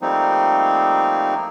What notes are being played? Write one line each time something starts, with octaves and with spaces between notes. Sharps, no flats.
F3 G3 A3 A#3 C4 D#4